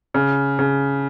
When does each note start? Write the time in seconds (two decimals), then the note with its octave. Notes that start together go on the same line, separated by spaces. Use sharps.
0.14 C#3
0.59 C#3